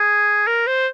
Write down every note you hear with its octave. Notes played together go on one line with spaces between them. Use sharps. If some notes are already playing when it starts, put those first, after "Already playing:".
Already playing: G#4
A#4
C5